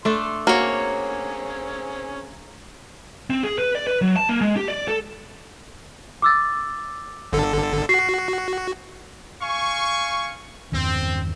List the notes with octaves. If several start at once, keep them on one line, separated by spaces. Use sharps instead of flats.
A3 D4 A4 C6
A#3 C4 C#4 F#4 G#4 C#5
C4
G#4
B4
D5
B4
F#3
A5
A#3
G#3
G4
D5
A4
D6 E6 A6
G1 D3 A4
F#4 C7
F5 G#5 C#6
E2 G2 D#3 C4